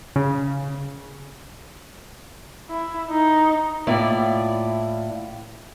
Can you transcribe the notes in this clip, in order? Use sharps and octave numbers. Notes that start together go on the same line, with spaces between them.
C#3
E4
D#4
A2 A#3 E4 F4 D5